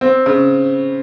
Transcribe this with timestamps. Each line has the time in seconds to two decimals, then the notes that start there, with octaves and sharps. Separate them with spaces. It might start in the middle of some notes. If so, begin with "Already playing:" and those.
0.01 C4
0.26 C#3